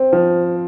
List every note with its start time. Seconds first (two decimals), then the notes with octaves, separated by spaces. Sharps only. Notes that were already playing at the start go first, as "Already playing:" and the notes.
Already playing: C4
0.13 F3